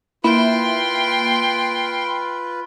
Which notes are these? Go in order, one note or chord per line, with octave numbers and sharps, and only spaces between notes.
A#3 E4 F4 B4 G5 C6